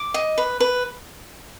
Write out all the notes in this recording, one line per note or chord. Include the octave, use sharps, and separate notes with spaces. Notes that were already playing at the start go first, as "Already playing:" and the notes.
Already playing: D6
D#5
B4
B4